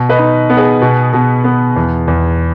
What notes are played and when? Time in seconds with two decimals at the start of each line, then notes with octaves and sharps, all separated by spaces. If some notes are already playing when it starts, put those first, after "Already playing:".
Already playing: B2
0.09 B4 D#5
0.18 D#4
0.50 B3
0.57 G#4 B4
0.81 B2
1.13 B2
1.44 B3
1.76 E2
2.07 E2